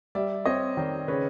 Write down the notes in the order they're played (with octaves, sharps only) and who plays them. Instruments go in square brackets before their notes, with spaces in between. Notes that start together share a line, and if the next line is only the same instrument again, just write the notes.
[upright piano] G3 [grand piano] D5 E5
[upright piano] C4 [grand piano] C#5 D#5
[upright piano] D#3 [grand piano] C5 D5
[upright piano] C#3 [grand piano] B4 C#5